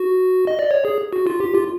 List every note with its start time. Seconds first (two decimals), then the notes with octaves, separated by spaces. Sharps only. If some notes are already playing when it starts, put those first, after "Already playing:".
Already playing: F#4
0.47 D#5
0.59 D5
0.71 C#5
0.85 G#4
1.13 F#4
1.27 F4
1.40 G4
1.55 F4